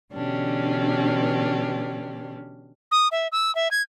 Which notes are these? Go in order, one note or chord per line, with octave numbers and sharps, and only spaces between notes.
B2 D3 E3 C#4 D4 G4
D#6
E5
E6
E5
G#6